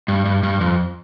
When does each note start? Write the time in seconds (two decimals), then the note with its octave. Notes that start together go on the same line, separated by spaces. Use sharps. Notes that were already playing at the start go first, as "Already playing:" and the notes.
0.08 G2
0.25 G2
0.43 G2
0.61 F2